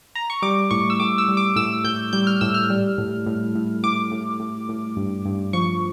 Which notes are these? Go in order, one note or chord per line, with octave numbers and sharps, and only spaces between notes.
A#5
C#6
G3 D6
A2 C#6
E6
A2 D6
E6
G3
D6
A2 E6
A2 G6
G3 G6
F6
A2 E6
F6
G3
A2
A2
A2
A2 D6
A2
A2
A2
G2
G2
F3 C#6